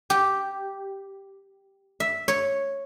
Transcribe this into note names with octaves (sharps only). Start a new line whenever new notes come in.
G4
E5
C#5